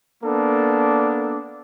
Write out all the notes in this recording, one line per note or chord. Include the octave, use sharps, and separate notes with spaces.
A#3 B3 D4 A4